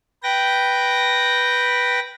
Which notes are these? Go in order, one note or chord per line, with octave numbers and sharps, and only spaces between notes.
B4 G5 A#6